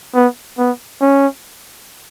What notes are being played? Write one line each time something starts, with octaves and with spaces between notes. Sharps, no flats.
B3
B3
C#4